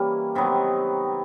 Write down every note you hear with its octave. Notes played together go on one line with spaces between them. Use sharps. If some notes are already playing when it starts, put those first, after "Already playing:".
Already playing: E3 G3 A#3 C#4 E4
C3 D#3 F#3 B3